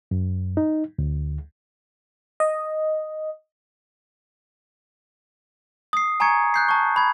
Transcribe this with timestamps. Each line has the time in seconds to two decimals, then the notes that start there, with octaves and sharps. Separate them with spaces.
0.11 F#2
0.57 D#4
0.99 D2
2.40 D#5
5.93 D#6 C7
6.20 G#5 A#5 C#6 G#6 C#7
6.54 F#6 G6 C7
6.69 A5 C#6
6.96 B5 G#6